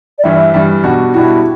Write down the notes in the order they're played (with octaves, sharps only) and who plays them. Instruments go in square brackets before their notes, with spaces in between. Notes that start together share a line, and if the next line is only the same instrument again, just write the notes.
[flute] D5
[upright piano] G2 E3 G3 [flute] E5
[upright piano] G2 E3 G3
B2 G3 D4 F#4
[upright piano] B2 G3 D4 F#4 [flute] E4